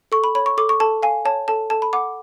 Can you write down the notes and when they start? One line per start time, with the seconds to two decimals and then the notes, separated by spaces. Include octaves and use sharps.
0.12 A4 C#6
0.24 B5
0.35 C#5 B5
0.46 C#6
0.57 A4 D6
0.69 C#6
0.80 A4 A5
1.03 F5 G#5
1.25 C#5 A5
1.48 A4 A5
1.70 A4 A5
1.82 B5
1.93 F#5 D6